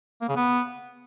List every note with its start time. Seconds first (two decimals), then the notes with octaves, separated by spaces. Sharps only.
0.21 A#3
0.29 C#3
0.36 B3